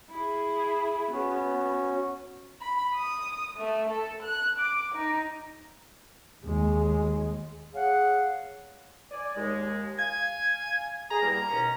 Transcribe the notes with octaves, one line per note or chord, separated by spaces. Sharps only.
E4 G#4
B3 C#4 F#4
B5
D#6
A3
A4
F#6
D6
D#4
D#2 G#3
G#4 C#5 F5 F#5
D5 G#5
D#2 G#3
F5 G#5 G#6
G#4 A#5
E2 G3 A#3
D#2 B2 C#4